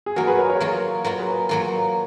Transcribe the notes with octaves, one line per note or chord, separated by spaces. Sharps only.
G#4
F#3 A#3 F4 F#4 A#4
G#4 B4
A#4 C#5
A#4 C#5
F#3 A#3 F4
F#3 A#3 F4 B4
C#5
G#4 B4
F#3 A#3 F4